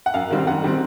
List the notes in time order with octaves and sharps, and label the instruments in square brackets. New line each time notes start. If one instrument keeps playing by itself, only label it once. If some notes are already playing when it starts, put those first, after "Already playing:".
[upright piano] F#5
F#2 F5
D#3 G3 C4
F#2 F#5
D#3 G3 C4